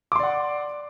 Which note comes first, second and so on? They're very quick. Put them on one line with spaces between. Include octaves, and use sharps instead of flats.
D6 C6 D5 F#5